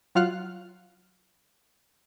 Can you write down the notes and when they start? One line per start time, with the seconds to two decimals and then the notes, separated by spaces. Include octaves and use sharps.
0.15 F#3 F4 F5 F#5 F6 F#6